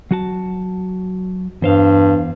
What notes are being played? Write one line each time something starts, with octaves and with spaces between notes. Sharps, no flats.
F#3 F#4 A5
E2 G2 C5 F5